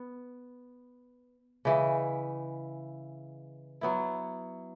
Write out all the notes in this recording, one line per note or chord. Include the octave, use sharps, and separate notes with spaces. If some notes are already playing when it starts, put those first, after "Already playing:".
Already playing: B3
C#3 E3 G#3
F#3 B3 E4